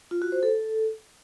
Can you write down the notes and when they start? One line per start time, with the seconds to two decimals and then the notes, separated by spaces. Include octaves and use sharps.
0.11 F4
0.22 F#4
0.32 C5
0.43 A4